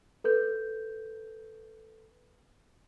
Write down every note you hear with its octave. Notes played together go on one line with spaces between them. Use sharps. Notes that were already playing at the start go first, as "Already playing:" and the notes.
A4 B4 G6